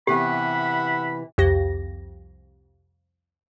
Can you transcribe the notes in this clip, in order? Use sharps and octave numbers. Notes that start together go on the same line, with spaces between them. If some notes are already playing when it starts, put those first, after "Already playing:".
C3 E3 B3 G4 E5 F#5 B5
C2 F2 G4 A#6